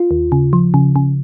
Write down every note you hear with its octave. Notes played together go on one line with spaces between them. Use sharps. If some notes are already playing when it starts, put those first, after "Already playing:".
Already playing: F4
D#2
C#3
F3
C#3
C#3